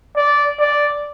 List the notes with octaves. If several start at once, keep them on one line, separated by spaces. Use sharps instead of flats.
D5
D5